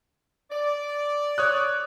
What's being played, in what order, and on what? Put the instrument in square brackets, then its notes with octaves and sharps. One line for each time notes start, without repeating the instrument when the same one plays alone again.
[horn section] D5
[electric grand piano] C#5 D#6 F#6